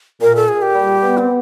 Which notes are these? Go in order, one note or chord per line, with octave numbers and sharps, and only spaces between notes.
A#2 A#4
A4
A#2 G#4
G4
G3
B3
C4